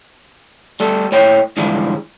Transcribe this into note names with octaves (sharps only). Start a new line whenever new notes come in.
G3 A3 A4
A2 C#5 D#5 G5
G#2 D3 E3 F3 G3 G#3